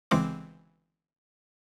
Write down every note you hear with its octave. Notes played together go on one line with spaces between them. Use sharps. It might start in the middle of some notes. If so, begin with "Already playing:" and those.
G1 C#3 E3 G#3 C4 D6